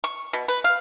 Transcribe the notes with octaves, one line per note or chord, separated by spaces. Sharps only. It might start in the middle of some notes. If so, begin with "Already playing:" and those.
C#6
B2
B4
F5